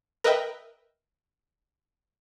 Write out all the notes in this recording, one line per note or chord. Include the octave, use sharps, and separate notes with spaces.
A#4 B4 D#5 E5 G5